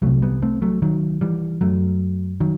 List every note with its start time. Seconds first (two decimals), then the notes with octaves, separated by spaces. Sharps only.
0.02 C2 C3 F#3 A3
0.22 G3 B3
0.42 A3 C4
0.62 F#3 A3
0.82 D#3 F#3
1.21 E3 G3
1.61 F#2 F#3 A3
2.40 D#3 F#3